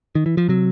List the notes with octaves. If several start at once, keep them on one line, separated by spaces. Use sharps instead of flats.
D#3
E3
F3
C3 F#3